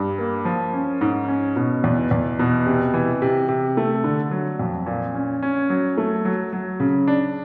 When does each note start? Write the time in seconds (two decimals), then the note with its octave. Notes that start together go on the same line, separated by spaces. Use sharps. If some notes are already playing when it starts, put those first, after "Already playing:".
Already playing: G2
0.18 A#3
0.45 F3
0.73 C#4
1.01 G#2
1.28 C#4
1.56 B2
1.84 E2
2.11 E2
2.39 B2
2.67 C3
2.94 E3
3.22 C3
3.49 C3
3.77 A3
4.04 D3
4.31 F#3
4.59 F2
4.86 A#2
5.14 C#4
5.42 C#4
5.70 F#3
5.97 A3
6.25 F#3
6.53 F#3
6.80 C#3
7.08 D4